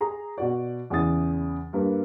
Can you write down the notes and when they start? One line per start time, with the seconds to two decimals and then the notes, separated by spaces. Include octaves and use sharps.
0.01 G#4 A#5
0.38 B2 F#4 D5
0.90 E2 C#3 C#4 E4 D#6 A6
1.73 G2 A#3 B4